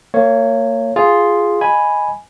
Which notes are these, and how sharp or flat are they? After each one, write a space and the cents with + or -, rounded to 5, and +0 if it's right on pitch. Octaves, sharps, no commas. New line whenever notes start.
A#3 -35 C#5 +0
F4 +0 G#4 +0
D#5 +0 G#5 +0 B5 +0